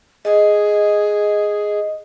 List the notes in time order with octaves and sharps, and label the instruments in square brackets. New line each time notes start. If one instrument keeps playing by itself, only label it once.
[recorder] G#4 [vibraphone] D#5